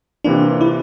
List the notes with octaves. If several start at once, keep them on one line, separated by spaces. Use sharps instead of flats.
C3 E3 A#3 D4 F4
E4